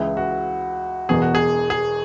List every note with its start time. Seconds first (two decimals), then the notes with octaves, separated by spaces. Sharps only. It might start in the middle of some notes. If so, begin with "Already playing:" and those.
Already playing: C#2 C#3 E3 G#3 E4
0.17 F#4
1.09 E1 E2 B2 G#4
1.22 F#4
1.35 G#4
1.70 G#4